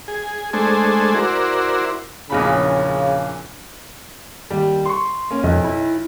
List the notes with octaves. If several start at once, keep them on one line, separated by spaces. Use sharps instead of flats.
G#4
G#3 A3 D4 G#4 A4 C5
E4 F#4 A#4 C5 D5
A#1 E2 C#3 B5
D#2 G3
C6 C#6
A#3 C#4
B1 F2
E4